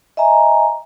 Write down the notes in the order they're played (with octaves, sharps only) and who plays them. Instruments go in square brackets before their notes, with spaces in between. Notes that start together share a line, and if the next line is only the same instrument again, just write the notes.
[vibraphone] D#5 E5 G#5 A#5